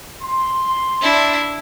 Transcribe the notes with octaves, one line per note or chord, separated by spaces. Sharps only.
C6
D4 E4